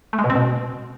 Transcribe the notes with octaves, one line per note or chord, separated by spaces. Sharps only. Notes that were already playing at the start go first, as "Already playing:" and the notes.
A3
G#3
B2
C4
B2